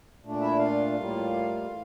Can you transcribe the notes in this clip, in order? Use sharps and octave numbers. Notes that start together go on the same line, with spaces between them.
A#2 A3 D4
E4 E5
F4 F5
A2 G3 A#3
A2 E3